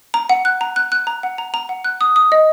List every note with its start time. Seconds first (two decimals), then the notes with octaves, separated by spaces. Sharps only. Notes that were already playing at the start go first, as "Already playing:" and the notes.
0.14 A#5
0.29 F#5
0.45 F#6
0.61 A#5
0.76 F#6
0.92 F#6
1.07 A#5
1.23 F#5
1.38 A#5
1.54 A#5
1.69 F#5
1.85 F#6
2.01 D#6
2.16 D#6
2.32 D#5